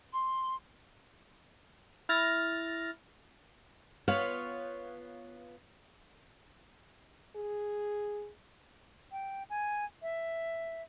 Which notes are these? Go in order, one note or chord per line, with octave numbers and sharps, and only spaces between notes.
C6
E4 F6 A6 A#6
B3 F4 C#5 F5
G#4
G5
G#5
E5